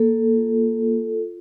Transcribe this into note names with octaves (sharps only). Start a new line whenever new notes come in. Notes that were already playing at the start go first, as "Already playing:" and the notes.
Already playing: A#3 A4
F4
F4